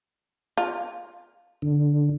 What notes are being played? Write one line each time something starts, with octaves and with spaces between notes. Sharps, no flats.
F4
D3